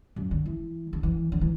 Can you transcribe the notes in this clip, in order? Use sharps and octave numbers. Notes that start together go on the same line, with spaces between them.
F#2
D3
E3
D3
E3
D3
E3